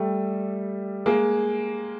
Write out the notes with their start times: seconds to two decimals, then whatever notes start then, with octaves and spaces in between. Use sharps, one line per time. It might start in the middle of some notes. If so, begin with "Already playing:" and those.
Already playing: G3 A3
1.06 G#3 A#3